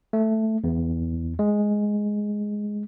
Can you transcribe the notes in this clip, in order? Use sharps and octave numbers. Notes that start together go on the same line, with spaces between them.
A3
E2
G#3